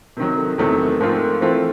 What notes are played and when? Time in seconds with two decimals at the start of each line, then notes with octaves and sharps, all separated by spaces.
0.17 C3 D#3 F#3 A#4
0.38 A4
0.58 E2 C3 D#3 F#3 A3 A#4
0.79 A4
1.00 G#2 F3 A3 C4 F4 A#4
1.41 E3 A3 C4 F4 C5